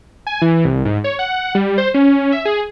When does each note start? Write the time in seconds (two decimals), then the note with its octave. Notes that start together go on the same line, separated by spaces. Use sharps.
0.27 G#5
0.42 E3
0.65 C2
0.85 G#2
1.04 C#5
1.19 F#5
1.55 G3
1.78 C5
1.94 C#4
2.32 E5
2.45 G#4